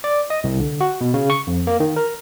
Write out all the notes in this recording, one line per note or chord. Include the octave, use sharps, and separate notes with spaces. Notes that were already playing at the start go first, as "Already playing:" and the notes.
D5
D#5
C2
D3
F#4
B2
C#3
C#6
F2
A#3
D#3
A#4